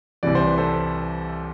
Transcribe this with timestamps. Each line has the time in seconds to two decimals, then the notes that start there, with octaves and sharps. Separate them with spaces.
0.23 C2 C3 E3 D5
0.35 C5
0.46 B4
0.58 A4 C5